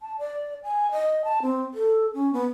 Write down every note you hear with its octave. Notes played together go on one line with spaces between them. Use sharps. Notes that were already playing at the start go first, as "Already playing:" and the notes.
A5
D5
G#5
D#5
A5
C4
A4
C#4
B3